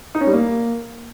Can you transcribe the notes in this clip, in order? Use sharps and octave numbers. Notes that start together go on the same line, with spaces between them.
D#4
C#4
G3
A#3